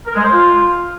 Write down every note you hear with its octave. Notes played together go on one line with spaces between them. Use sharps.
A#4
G#3
C5
F4